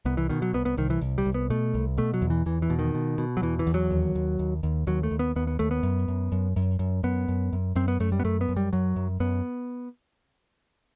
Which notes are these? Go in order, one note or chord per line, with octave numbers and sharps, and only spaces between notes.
C2 B3
E3
B2 D#3
F#3
C2 B3
B3
C2 D#3
E3
C2
G3
C2
B3
B2 A3
C2
B2 A3
F#3
E2
E3
E2 E3
E3
B2
D#3
B2
B2
F#3
E2 E3
E3
E2
F#3
D#2
D#2
D#2
D#2
D#2 F#3
A3
D#2
B3
D#2 B3
B3
D#2 A3
B3
F#2
F#2
F#2
F#2
F#2
F#2 B3
F#2
F#2
F#2 C4
B3
F#2 A3
G3
B3
F#2 A3
B3
F#2
G3
F#2 F#3
F#2
F#2 B3